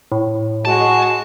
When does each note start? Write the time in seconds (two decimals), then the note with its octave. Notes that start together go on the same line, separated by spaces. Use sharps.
0.12 A2
0.65 G#3 F#4 A5